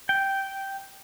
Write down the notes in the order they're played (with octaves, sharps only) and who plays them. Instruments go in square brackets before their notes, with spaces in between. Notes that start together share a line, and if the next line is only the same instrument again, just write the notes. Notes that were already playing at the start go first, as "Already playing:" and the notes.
[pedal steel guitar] G5